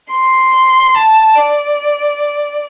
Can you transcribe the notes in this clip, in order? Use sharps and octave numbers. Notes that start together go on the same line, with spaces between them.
C6
A5
D5